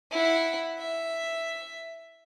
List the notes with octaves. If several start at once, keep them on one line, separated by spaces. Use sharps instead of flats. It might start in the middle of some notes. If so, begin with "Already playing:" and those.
E4 F#5
E5